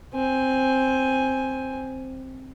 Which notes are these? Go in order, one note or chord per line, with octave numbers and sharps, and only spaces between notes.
C4 G#5